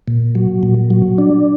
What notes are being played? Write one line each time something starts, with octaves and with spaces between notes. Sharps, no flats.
A#2
F#3
A#2
F#3
D4